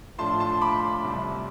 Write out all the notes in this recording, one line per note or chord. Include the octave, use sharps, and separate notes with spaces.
A2 F3 A3 D4 F4 A5 C6
A5 C6
B5 D6
C2 C3 G3